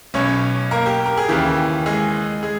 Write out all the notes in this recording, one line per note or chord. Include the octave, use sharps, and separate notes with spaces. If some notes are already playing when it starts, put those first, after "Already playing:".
B1 B2 C#4 C#5
A#3 A#4
G4
A#4
G#4
D#2 C#3 E3 G4
G#3 G#4
G#3 G#4